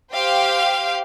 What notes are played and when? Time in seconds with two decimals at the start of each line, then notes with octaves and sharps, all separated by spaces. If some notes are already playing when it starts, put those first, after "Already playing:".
0.13 G4 C5 F5 G5